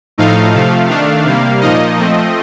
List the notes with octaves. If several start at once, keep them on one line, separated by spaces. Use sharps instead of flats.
A2 F3 A3 D#4 F5
C3 F3 A3
D#3 A3 D4
C3 G3 A#3
A#2 F3 A#3 D#4 D#5
F3 A3 C4